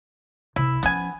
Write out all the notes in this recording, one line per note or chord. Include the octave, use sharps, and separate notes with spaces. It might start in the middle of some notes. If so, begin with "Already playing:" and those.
C2 E4
F3 B3 C#4 G#5